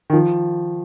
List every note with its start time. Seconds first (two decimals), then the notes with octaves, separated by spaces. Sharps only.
0.10 D#3
0.13 F3